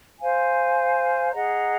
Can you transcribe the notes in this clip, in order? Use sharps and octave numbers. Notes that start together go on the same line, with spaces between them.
C5 F5 G#5
G#4 D#5 F#5 A#5